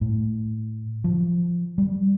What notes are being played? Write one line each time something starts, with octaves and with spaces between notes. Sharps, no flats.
A2
F3
G3